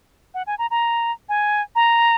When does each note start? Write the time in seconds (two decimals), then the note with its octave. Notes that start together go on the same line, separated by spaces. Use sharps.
0.34 F#5
0.47 G#5
0.59 A#5
0.71 A#5
1.29 G#5
1.75 A#5